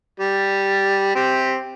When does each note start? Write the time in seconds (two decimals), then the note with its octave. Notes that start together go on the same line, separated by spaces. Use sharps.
0.20 G3
1.16 C4 G4